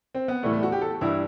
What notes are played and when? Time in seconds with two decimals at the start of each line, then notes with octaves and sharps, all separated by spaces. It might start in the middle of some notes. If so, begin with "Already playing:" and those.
0.15 C4
0.28 B3
0.43 A2 E3 G3 A3
0.53 A3
0.63 F#4
0.72 G4
0.81 A4
1.01 G2 E3 G3 E4